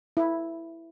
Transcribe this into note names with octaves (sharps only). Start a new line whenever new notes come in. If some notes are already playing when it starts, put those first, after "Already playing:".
E4